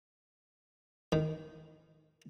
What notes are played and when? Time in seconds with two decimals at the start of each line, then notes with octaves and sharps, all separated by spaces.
1.12 D#3